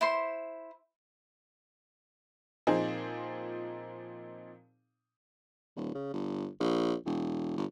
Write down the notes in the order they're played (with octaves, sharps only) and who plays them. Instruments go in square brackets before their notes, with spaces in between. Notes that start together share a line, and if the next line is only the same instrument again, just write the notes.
[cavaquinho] E4 C5 C6
[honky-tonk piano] A#2 F3 C4 D#4 G#4 C5
[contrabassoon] D#1
C#3
G1
A#1
E1
G1